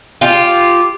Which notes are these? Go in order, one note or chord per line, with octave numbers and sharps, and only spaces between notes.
F4 G4